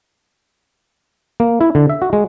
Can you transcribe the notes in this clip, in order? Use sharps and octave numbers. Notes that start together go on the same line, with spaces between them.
A#3
E4
D3
E5
F#4
G#3